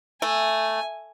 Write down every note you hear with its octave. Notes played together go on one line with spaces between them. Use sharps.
A3 G#5